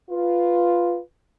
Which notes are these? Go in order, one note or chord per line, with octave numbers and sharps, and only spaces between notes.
F4 B4